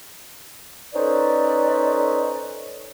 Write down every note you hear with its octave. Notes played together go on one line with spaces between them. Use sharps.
C#4 D#4 A4 B4 C5 D5